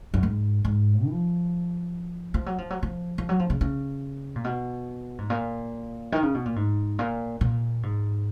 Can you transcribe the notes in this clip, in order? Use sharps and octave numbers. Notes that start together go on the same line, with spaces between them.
F#2
G#2
G#2
F3
F3
F#3
F3
F#3
F3
F3
F#3
F3
C#3
C#3
A#2
B2
G#2
A#2
D#3
C#3
B2
A#2
G#2
A#2
A#2
G#2